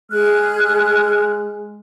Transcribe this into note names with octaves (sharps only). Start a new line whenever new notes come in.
G#3 G#4 F6 F#6